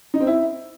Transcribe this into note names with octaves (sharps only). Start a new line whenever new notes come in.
D#4
C4
E4